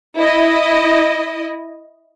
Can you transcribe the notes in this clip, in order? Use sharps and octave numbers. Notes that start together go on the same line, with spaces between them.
E4 D#5